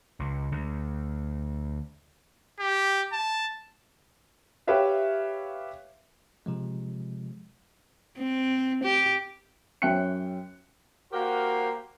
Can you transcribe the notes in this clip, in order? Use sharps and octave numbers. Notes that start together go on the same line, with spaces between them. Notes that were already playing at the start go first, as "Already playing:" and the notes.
C#2
D2
G4
A5
G4 B4 C#5 E5 F5
C3 F3 G#3
C4
G4
F#2 C#4 E5 G5 F#6 C#7
A#3 F#4 G4 A#4 C5 F5